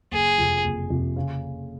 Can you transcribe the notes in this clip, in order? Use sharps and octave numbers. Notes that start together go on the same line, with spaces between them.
F#1 G#4
F2 C3
F#1
F2 C3
C#3